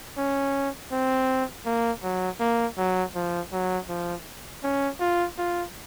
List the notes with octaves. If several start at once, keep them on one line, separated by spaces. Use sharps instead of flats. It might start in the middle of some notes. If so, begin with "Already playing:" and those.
C#4
C4
A#3
F#3
A#3
F#3
F3
F#3
F3
C#4
F4
F4